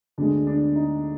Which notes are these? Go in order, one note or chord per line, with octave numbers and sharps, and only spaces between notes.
D2 D3 G#3 D4
D4
D#4